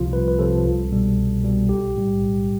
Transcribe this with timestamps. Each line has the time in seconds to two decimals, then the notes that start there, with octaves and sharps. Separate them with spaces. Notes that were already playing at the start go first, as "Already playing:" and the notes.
Already playing: C2 C3 F3 F4
0.13 C2 B4
0.28 B4
0.39 C3 F3 A4
0.65 C2
0.92 B2 G3
1.17 C2
1.43 B2 G3
1.69 B1 G4
1.96 A2 G3
2.21 B1